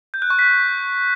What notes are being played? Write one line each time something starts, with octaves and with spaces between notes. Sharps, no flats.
G6
F#6
C#6
B6